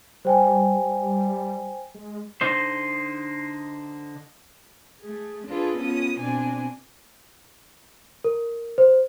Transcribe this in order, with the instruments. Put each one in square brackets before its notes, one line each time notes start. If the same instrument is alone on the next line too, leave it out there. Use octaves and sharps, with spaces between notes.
[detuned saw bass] G3 [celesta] C5 G5 G#5
[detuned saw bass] G#3
[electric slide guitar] D3 D#4 C5
[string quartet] A3 G#4
D4 F4 G#4 A4 B4
B3 C#4 F4 D#6
B2 C4 D4 G#5
[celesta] A#4
C5